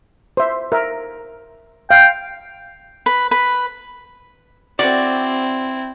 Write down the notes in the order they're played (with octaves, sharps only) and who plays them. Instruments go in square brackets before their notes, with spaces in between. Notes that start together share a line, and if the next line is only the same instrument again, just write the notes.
[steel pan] C5 E5
A#4 E5
[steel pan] F5 [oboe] G5
[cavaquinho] B4
B4
[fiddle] C4 E4 [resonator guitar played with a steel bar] F#4 D5